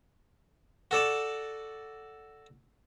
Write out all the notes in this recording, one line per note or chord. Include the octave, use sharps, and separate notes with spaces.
F#4 A4 D5 A5